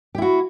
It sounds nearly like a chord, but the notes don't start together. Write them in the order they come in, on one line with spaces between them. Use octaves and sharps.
G4 E4 F#4